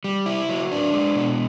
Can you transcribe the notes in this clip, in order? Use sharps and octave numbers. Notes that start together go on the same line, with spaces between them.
G3
E4
F#3
D4
G#3
B2